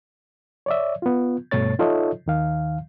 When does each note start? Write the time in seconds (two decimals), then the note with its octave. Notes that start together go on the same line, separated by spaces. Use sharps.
0.66 C#5 D5 E5
1.02 B3 F4
1.51 G2 B2 A3 C#5 A6
1.79 D#4 F4 A4 C#5 D#5 E5
2.26 D#2 D#3 F5